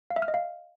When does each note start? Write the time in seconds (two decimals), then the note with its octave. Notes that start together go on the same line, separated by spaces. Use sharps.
0.10 F5
0.16 E5
0.22 F6
0.28 D#5
0.34 F5